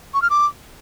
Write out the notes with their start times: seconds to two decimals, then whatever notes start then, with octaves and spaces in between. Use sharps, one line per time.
0.14 C#6
0.22 F6
0.30 D6